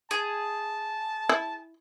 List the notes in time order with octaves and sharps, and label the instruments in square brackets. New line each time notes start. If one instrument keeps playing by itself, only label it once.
[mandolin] G#4 [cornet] A5
[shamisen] E4